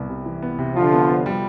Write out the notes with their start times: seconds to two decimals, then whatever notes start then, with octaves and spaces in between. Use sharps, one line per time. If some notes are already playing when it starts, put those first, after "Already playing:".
Already playing: C2 B3
0.09 C3
0.26 E3
0.42 B3
0.59 C3
0.75 D3 F3 F4
0.93 B3
1.09 B3
1.26 G3